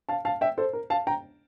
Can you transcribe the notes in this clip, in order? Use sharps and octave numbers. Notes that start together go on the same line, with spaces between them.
F5 A5
F5 A5
E5 G5
A4 C5
A#4
F5 A5
G5 A#5